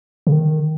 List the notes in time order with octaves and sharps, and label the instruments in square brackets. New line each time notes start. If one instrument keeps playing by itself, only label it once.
[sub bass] C#3
D#3